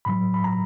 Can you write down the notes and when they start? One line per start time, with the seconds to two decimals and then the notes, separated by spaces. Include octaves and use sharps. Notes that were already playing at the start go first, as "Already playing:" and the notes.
0.05 A2 F#3 B5
0.34 B5
0.44 A#5